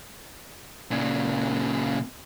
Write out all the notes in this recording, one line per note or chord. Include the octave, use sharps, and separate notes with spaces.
A#2 C#3